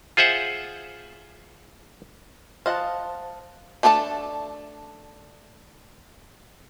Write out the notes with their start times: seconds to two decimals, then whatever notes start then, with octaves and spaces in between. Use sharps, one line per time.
0.17 F4 G#4 C5 E5 F#5
2.66 F4 C5 D#5 F#5 A5
3.83 A3 D4 A4 C5 A5